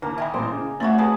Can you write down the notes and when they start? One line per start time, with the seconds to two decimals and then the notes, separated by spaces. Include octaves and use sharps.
0.02 D#2 A#3
0.18 D#4 E5 G5 G#5 A#5 B5
0.34 A1 A#2 C5 D6
0.52 C#3
0.80 A3 C4 F#4 C#5 E5 F#5 A#5 F#7
0.98 G#4 B4 G#5 A5 B5 D#6